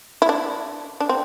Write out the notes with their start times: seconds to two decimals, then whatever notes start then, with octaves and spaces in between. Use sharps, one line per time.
0.22 E4
0.29 D4
1.00 D4
1.09 C4